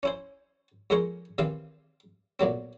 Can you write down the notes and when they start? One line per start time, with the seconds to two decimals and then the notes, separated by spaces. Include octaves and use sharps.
0.03 C#4 E4 C5
0.90 F2 G#3 G#4 A#4 C5 C#6
1.38 C3 D#3 E3 C4 F5
2.39 B1 A#2 F#3 C4